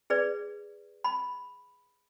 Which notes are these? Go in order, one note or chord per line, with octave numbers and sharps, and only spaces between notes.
G#4 B4 D5
B5